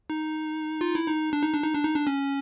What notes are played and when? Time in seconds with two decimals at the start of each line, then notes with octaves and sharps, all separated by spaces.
0.10 D#4
0.81 F4
0.95 E4
1.08 D#4
1.33 D4
1.43 D#4
1.54 D4
1.63 D#4
1.74 D4
1.84 D#4
1.95 D4
2.07 C#4